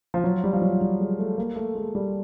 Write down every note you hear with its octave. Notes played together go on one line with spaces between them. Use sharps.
F3
F#3
G3
F3
F#3
G3
G#3
A3
A#3
A3
G#3
G3